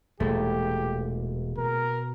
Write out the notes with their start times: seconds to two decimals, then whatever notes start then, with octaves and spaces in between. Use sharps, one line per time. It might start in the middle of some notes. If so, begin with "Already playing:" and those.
0.20 E1 A#2 E3 G#3 A3 G4
1.58 B2 A#4